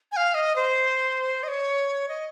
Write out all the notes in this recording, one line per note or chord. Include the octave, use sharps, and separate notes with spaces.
G#5
F5
D#5
C5
D#5
C#5
D#5